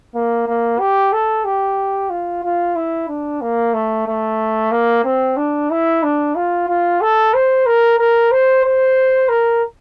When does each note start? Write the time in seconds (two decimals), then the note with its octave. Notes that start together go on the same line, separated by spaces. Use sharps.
0.15 A#3
0.47 A#3
0.79 G4
1.13 A4
1.45 G4
2.10 F4
2.44 F4
2.76 E4
3.08 D4
3.41 A#3
3.74 A3
4.07 A3
4.71 A#3
5.04 C4
5.37 D4
5.71 E4
6.03 D4
6.35 F4
6.69 F4
7.01 A4
7.34 C5
7.66 A#4
7.98 A#4
8.31 C5
8.65 C5
9.29 A#4